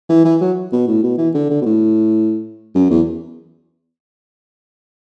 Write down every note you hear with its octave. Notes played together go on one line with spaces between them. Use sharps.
E3
E3
F#3
B2
A2
B2
E3
D3
D3
B2
A2
F#2
E2